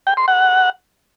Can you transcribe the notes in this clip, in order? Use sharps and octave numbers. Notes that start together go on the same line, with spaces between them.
G5
C6
F#5